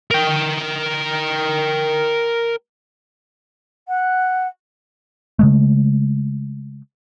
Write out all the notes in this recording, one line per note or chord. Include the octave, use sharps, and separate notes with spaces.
A#4 G5
F#5
C#3 G#3 A3